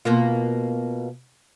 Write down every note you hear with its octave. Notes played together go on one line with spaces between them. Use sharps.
B2 A#3 F4